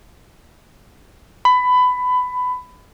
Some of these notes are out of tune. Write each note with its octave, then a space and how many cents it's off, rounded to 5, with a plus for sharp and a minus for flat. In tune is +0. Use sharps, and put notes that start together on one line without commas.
B5 +20